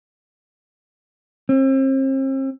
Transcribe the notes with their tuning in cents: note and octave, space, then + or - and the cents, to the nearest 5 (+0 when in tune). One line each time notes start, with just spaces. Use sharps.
C4 +40